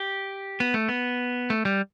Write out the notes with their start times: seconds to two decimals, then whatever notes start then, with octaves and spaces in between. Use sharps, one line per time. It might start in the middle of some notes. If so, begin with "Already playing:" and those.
Already playing: G4
0.60 B3
0.74 A3
0.88 B3
1.50 A3
1.65 G3